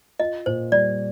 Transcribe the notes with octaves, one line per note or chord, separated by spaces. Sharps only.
F4 D#5
A#2 C5
G3 D5